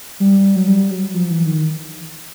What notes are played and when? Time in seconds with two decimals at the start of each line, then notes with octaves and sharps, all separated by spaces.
0.20 G3
0.56 F#3
0.68 G3
0.91 F#3
1.14 F3
1.30 E3
1.46 D#3